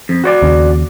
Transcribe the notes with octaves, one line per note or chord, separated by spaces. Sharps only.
F2
F#4 C#5 D5
D#2 C#3